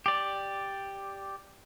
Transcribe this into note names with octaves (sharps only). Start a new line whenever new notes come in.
G4 D5